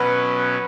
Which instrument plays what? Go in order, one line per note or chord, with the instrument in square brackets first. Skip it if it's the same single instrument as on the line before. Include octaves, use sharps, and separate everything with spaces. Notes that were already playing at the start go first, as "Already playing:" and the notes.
Already playing: [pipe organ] B2 F#3 C#4 [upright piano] B4